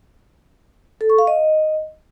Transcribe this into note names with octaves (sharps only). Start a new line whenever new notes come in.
A4
C#6
F5
D#5